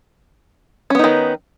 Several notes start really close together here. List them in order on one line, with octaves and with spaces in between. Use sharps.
C#4 B3 D#4 D#3